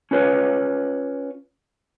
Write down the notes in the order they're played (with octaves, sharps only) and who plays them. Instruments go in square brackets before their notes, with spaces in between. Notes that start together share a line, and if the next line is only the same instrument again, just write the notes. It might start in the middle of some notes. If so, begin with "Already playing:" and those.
[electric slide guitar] C#4 F4 B4 C#5